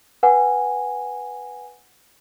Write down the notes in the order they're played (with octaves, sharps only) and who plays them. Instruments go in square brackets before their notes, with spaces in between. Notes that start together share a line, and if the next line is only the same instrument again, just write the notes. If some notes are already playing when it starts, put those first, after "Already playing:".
[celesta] B4 F#5 G#5